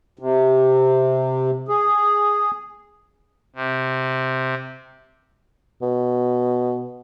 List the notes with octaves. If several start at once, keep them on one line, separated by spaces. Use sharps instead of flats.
C3
G#4
C3
B2